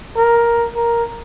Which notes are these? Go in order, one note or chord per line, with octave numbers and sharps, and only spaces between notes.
A#4
A#4